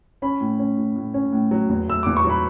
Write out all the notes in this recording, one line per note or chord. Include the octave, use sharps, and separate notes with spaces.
C#4 B5
A2
C#4
A2
A2
C#4
A2
F#3
E2
A3 E6
E2 D6
C#6
F#3
B5